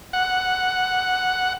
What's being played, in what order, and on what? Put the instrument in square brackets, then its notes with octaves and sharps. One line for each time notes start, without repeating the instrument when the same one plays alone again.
[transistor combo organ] F#5